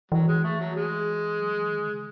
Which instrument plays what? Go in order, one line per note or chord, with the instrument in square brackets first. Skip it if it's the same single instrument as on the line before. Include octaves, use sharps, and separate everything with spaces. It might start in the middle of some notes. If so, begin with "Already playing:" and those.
[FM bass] E3 [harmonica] F#3
[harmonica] G#3
A3
F#3
G#3
[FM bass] F#3
E3
D#3
C#3